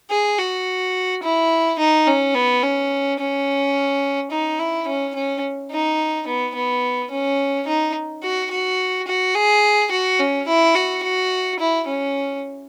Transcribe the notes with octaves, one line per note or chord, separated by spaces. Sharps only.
G#4
F#4
E4
D#4
C#4
B3
C#4
C#4
D#4
E4
C#4
C#4
D#4
B3
B3
C#4
D#4
F#4
F#4
F#4
G#4
F#4
C#4
E4
F#4
F#4
E4
C#4